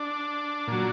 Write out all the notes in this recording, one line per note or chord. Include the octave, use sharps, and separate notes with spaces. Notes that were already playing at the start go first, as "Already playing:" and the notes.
Already playing: D4
A#2 F#3